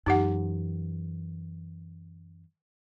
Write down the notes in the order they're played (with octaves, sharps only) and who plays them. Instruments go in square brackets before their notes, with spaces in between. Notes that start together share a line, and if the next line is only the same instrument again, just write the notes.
[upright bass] F#2 E3 [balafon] D#4 G4 F#5